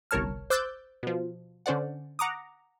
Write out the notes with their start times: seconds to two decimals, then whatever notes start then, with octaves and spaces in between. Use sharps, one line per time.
0.11 G1 C2 A#4 C#5 A5 F6
0.50 C5 D6 E6 F#6 G6 A6
1.03 B2 F3
1.66 D3 C#4 C5 D5 F#5
2.19 F#5 A#5 D6 D#6